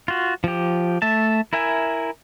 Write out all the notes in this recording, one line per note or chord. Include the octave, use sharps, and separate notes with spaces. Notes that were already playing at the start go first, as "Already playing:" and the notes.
F4 F#4
F3 G4
A3 E5 A5
E4 A#4 E5 G#5